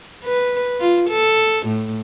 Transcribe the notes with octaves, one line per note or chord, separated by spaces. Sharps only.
B4
F4
A4
A2